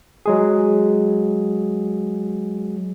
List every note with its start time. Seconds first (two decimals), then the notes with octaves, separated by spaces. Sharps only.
0.26 F#3 G#3 G#4